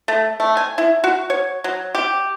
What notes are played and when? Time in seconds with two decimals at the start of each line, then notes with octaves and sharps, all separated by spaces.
0.08 A3
0.40 A3
0.57 G#5
0.78 E4
1.04 F#4
1.30 C#5
1.64 F#3
1.95 G4